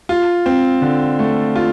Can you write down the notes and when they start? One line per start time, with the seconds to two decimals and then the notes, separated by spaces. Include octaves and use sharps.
0.09 F4
0.46 C4
0.82 D3
1.19 A3
1.56 F4